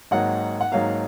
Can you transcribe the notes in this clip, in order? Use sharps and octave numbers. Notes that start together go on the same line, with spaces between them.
G#1 G#2 F#3 A#3 F#5
F#5
G#1 G#2 F#3 A#3 F5